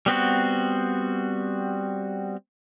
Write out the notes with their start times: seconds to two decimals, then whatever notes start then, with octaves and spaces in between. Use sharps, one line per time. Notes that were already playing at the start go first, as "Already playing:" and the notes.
0.06 G3 B3 C4 F#4